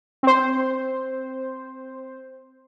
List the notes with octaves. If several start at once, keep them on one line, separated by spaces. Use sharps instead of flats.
C4 C5